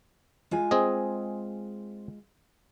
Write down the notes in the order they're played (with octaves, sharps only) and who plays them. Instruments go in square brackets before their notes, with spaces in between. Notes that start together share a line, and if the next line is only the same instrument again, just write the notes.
[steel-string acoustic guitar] G#3 F4 G#5
[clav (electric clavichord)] C4 G#4 D#5